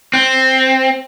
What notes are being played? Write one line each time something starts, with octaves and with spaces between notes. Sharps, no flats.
C4